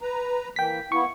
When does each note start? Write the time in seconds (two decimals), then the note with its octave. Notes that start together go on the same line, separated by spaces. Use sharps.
0.01 B4 A#5
0.56 E3 A#3 G5 B6
0.92 A#3 B3 E4 C#6